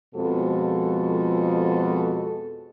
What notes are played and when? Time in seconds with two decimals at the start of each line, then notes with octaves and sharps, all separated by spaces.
0.15 F2 B2 F3 G#3 F#4 A4